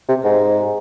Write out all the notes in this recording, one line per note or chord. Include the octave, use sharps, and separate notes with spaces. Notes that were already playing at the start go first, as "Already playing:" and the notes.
C3
G#2